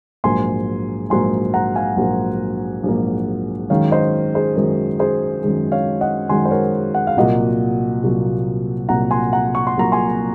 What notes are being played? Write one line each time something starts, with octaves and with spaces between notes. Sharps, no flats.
A#1 G#2 F#3 A#3 G#5 C6
A#1 G#2 F#3 A#3 G#5 C6
F#5 A#5
F5 G#5
A#1 G#2 F#3 A#3
A#1 G#2 F#3 A#3
F#2 D#3 G#3 C#5 F5
C5 D#5
G#4 C5
F#2 D#3 G#3 A#4
G#4 C5
F#2 D#3 G#3
C#5 F5
D#5 F#5
F#2 D#3 G#3 G#5 C6
C5
A#4 C#5
F#5
F5
C2 A#2 F#3 A#3 D#5 F#5
C2 A#2 F#3 A#3
C2 A#2 F#3 A#3 F#5 A#5
G#5 C6
F#5 A#5
C#6
C6
C2 A#2 F#3 A#3 A#5
G#5 C6